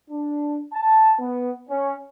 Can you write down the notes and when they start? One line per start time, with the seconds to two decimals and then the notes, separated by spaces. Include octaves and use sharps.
0.10 D4
0.74 A5
1.20 B3
1.70 C#4